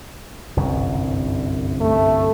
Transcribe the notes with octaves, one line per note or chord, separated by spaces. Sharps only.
G1 C2 F#2
A3